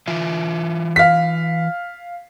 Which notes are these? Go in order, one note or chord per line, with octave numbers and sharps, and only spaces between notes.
E3 F4 E5
F5 B6